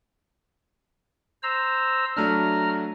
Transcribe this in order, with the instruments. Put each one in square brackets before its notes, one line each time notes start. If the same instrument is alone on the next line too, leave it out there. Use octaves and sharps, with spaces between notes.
[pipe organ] C5 A#5 E6
[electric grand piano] F#3 A3 D4 [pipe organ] A#5 F6